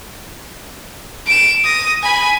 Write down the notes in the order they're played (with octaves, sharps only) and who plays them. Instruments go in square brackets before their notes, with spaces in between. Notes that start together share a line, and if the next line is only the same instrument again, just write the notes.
[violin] D7 E7
D#6 A#6
G#5 B5